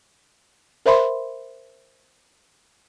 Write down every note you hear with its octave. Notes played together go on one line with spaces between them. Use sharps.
A#4 C5 E5 B5 C6